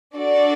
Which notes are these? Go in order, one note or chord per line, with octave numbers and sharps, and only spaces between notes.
D4 F#4 A4 D5